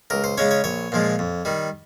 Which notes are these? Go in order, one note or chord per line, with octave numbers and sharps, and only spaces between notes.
C#2 A#4
C5
C#3 G#3 C#4 C#5
C#5
A#1 C#5
A#2 F3 G#3
F2
D#3 G3